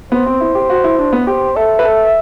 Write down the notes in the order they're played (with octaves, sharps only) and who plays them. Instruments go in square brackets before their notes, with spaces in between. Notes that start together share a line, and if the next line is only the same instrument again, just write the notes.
[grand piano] B3 [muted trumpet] C5
[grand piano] C4
E4
G4
F#4
E4
D4
B3
[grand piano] G4 [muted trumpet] C5
[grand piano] A4 [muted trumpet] E5
[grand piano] B4
A4